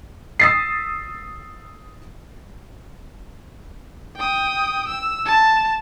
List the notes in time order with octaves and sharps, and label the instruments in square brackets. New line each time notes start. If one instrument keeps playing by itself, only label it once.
[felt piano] D#6 E6 A6 B6 C7
[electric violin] G5 D#6
E6
A5